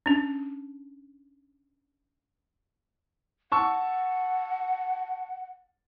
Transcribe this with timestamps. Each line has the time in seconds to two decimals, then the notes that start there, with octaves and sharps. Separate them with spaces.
0.06 C#4 D4
3.52 F#5 A5 C#6 E6